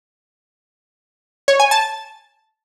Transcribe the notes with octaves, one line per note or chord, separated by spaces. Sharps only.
C#5
G#5
A5